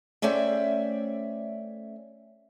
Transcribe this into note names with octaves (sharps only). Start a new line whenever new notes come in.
A3 C#4 C5 D5 E5 G5